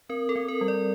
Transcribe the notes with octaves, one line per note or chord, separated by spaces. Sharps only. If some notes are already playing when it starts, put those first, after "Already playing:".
C4 A#4
A4
C4
A#4
G3
D5